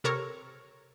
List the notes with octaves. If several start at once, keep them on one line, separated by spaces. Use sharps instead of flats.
C3 A4 A#4 C#5 C#6